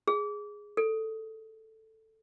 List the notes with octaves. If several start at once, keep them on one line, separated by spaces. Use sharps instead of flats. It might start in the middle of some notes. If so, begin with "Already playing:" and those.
G#4
A4